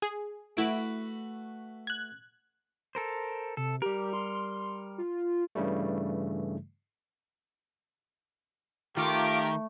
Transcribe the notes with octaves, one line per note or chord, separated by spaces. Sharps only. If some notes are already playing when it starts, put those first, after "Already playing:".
G#4
A3 E4 F#4 B4 D7
F#6 G#6
A4 A#4 C5
C3 A4
G3 G4 A#4
C6
F4
G2 C#3 E3 G3 A3
D#3 A3 F4 G4 A#4 D6